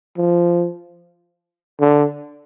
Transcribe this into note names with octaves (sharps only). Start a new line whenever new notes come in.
F3
D3